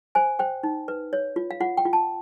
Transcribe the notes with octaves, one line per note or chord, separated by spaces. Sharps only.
C5 G#5
C5 G5
D#4
B4
C#5
F4
F5
F4 F#5
G5
F4
A5